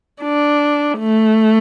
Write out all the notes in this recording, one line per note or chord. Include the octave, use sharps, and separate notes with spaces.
D4
A3